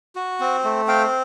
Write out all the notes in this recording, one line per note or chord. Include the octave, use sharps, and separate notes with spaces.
F#4
C4
A3
C4 F5 G5